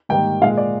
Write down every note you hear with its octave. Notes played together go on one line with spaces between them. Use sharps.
G#2 D#3 G3 A#3 G5
A#2 G#3 F5
D5